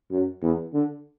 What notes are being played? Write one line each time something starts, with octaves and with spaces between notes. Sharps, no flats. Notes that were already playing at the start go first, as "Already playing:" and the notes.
F#2
E2
D3